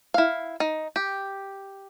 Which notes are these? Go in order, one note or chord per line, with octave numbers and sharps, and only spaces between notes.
E4 F5
D#4
G4